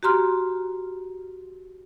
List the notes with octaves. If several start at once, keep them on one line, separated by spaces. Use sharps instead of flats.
F#4 G4 A#5 C6 F6